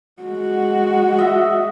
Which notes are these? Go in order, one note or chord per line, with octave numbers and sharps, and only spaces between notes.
G#3 F#4
D#5 E5